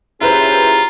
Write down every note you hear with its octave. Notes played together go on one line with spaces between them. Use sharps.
C#4 E4 F4 G4 G#4 B4 C5 A#5